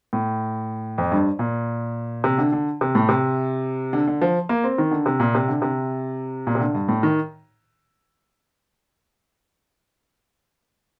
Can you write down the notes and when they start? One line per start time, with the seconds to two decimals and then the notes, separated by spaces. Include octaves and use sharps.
0.13 A2
0.98 F2
1.12 G2
1.39 A#2
2.24 C3
2.38 D3
2.52 D3
2.81 C3
2.95 A2
3.09 C3
3.93 D3
4.07 D3
4.21 F3
4.49 A#3
4.64 C4
4.78 D#3
4.91 D3
5.06 C3
5.20 A#2
5.35 C3
5.48 D3
5.62 C3
6.47 A#2
6.55 C3
6.61 D3
6.75 G2
6.89 A2
7.03 D#3